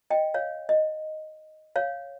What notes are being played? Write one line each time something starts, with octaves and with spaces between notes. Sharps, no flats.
D#5 G5
C#5 F5
D#5
C#5 F5